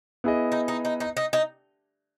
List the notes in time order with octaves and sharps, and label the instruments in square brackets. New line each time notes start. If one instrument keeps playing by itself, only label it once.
[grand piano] B3 E4 G#4 D#5
[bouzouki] D#4
D#4
D#4
D#4
D#4
D#4